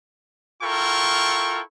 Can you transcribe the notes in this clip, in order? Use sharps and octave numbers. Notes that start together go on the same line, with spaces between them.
E4 F4 A4 A#4 G5 C#6